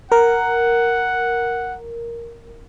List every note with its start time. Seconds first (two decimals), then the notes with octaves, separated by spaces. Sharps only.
0.12 A#4 F#5